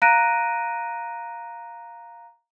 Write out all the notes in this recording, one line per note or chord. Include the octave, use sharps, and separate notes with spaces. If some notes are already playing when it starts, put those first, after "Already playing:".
F5 A#5 F#6 A#6 D7 D#7